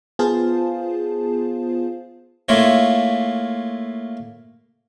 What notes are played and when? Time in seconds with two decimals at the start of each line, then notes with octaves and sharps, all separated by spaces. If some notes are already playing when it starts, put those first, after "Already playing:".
0.19 B3 F4 G#4 C5 F5 A5
2.49 A3 A#3 E4 F4 C#5